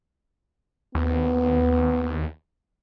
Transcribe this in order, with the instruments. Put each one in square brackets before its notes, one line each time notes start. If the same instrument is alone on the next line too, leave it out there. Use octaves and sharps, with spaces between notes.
[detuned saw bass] D#2 [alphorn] B3